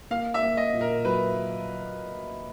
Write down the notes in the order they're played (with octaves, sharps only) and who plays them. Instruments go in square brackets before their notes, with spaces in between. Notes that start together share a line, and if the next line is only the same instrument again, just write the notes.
[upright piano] A#3 [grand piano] F5
[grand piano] E5
[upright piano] A#3
[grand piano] D#5
[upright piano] A#2
[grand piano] A#4
[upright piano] F#3 [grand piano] B4